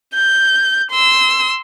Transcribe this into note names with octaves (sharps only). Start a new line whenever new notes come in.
G6
C6 E6